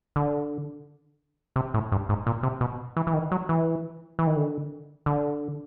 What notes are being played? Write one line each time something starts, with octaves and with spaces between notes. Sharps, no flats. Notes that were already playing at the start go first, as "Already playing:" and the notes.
D3
C3
A2
G2
G#2
A#2
C3
B2
E3
E3
D#3
F#3
E3
E3
D#3
D3
D3